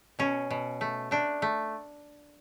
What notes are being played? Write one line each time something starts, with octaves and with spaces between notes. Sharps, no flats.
B2 C#4
B2
A3
A3 D4
A3